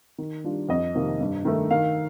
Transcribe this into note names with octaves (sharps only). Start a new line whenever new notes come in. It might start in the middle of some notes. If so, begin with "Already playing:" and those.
D#3
G3 D4 F4
F2 D#5
C3 D#3 A#3
G2
D#3 A3 D#4
D#3 F5